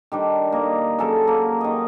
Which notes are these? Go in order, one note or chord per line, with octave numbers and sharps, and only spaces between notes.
D#3 G3 D4
A#3 D#5
C#3 F#3 A4 A#4
A#3
D#3 D#5